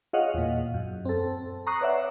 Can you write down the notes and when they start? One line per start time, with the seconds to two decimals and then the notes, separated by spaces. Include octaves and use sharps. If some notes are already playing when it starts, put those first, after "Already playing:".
0.13 F4 G#4 C#5 D#5 F5 F#5
0.34 E2 A#2
0.74 F#2
1.05 C4 A4
1.67 A#5 C#6 D#6 F#6 C7
1.81 B4 C#5 D5 E5 F#5